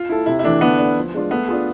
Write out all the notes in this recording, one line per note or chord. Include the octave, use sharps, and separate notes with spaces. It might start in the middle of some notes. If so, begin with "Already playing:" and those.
Already playing: F4
E4 A4
C3 E4
E4
E3 A3 D4
D3 B3
A3 D4
F3
G#3 D4 F4
A3 B3
D4 F4 G#4